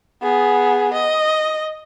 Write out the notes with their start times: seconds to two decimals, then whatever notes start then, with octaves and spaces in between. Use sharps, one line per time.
0.22 B3 G#4
0.93 D#5